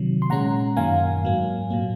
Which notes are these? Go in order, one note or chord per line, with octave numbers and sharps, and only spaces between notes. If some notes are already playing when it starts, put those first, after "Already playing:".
Already playing: C3 D#3 F#3
C6
A#2 G#3 C#4 F#5 A#5
F#2 D#3 F#3 A#3 F5 G#5
G#2 F#3 A#3
A#2 F#3 A#3